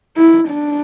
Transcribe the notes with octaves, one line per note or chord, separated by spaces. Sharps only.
E4
D4